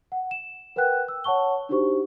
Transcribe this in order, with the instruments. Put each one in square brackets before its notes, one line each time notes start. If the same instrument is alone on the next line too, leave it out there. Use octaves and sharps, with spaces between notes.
[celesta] F#5
E7
A#4 B4 F#5 G5 F#6
E6
C#5 F#5 A5 C#6 G7
D4 D#4 F#4 G4 C5 C#6